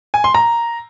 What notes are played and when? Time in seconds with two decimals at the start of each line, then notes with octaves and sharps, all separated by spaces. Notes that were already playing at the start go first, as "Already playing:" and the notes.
0.14 G#5
0.24 C6
0.35 A#5